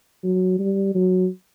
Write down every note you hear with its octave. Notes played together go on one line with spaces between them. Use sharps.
F#3
G3
F#3